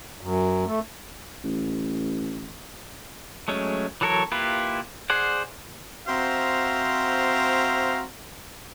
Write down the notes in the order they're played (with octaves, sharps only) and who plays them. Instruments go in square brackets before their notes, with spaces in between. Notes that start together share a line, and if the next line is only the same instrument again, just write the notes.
[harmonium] F#2
A3
[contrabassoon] A1
[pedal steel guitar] F#3 G#3 A3 C#4
E3 F#3 A4 A#4 C#5
A#3 E4 F4 G4 B4
G#4 C5 D5 F#5
[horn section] C4 F#4 C5 E5 F5 A#5